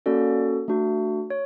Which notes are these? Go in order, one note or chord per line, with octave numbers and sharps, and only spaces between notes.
A#3 C#4 F#4 A4 D5
A3 D4 F#4
C#5